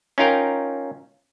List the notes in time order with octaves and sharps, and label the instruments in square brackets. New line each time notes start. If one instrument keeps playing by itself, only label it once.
[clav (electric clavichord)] C#4 D#4 F4 A#4 F5 G5